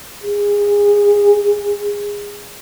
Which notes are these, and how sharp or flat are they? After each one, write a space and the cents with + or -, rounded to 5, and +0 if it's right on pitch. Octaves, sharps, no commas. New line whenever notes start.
G#4 -20